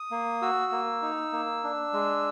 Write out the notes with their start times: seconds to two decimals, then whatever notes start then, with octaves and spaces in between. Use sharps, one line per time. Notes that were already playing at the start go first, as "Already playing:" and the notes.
Already playing: D#6
0.11 A#3
0.42 F#4 E6
0.72 A#3
1.02 D#4
1.33 A#3
1.64 D4
1.93 G#3